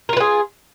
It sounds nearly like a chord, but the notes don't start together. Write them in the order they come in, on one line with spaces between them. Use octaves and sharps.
A#4 F4 B4 G#4